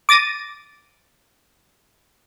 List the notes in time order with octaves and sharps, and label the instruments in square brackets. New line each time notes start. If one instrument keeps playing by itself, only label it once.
[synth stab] D6 A6 A#6 D#7